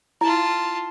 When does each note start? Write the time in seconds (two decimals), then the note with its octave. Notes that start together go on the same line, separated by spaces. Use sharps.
0.21 E4 F4 A5